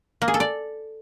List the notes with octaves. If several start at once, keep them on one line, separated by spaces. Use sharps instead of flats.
A#3
G#4
A4
D5